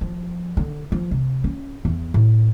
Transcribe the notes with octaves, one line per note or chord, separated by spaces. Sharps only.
F3
D3
F3
C3
C#4
E2
A2